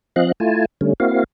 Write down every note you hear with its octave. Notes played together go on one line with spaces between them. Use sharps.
F3 C4 D#5 F5 F#6
A3 E4 F4 G#5 A5
D3 G3 A3 C#4
A#3 C4 E4 F#4 F5